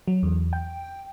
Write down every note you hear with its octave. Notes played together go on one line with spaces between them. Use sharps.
F#3
E2
G5